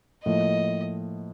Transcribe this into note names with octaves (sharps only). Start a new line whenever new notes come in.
A2 F3 A#3 D#5